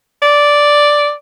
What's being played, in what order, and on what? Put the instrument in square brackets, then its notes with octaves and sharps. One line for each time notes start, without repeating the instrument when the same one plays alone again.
[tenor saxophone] D5